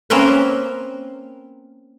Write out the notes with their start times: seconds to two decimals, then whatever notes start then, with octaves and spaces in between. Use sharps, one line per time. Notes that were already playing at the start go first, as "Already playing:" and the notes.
0.10 A#3 C4 C#4 A#4 B4